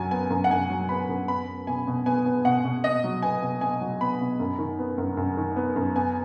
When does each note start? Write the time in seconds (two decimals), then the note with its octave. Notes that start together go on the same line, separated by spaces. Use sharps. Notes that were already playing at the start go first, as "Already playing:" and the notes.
Already playing: F#2 F#3 G#5
0.11 B3 G#5
0.30 F#2
0.44 F#5
0.51 F#2 G#5
0.70 F#3
0.89 B3 B5
1.09 F#2
1.28 B3 B5
1.47 B3
1.67 B2 G#5
1.87 B2
2.06 B3 G#5
2.25 B3
2.45 B2 F#5
2.65 B2
2.84 B2 D#5
3.04 F#3
3.22 B3 G#5
3.42 B2
3.61 B2 G#5
3.81 F#3
4.01 B3 B5
4.21 B2
4.40 F#2
4.59 D#3
4.79 B3
4.98 F#2
5.17 F#2
5.37 D#3
5.56 B3
5.76 F#2
5.95 B3 G#5